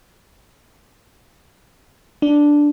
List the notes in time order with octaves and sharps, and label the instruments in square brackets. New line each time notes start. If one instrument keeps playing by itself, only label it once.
[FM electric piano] D4